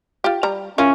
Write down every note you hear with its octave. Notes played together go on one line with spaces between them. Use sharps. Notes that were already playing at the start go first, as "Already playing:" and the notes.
F4 G4
G3 A#5
C#4 E4 F4 A#4